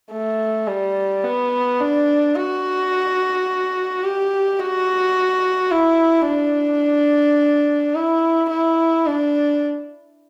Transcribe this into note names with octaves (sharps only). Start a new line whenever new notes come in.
A3
G3
B3
D4
F#4
G4
F#4
E4
D4
E4
E4
D4